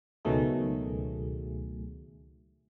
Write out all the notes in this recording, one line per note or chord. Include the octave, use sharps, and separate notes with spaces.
C#2 B2 D#3 F#3 A3 G#4